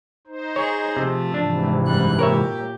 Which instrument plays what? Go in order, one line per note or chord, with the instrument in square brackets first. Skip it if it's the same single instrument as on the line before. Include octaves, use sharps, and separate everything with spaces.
[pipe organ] D#4 C5
[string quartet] G#4 [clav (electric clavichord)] C#5
[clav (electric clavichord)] C3 [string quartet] F3 A3
[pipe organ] G#2 C3 E3 [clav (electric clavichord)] D4
[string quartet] F#2 G3 F#6
[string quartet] A#2 G4 [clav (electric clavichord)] A#4 C#5 E5